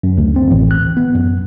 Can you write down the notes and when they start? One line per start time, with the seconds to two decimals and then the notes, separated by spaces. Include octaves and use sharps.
0.03 F#2
0.18 D2
0.36 C4
0.51 A1
0.71 F#6
0.97 B3
1.15 F#2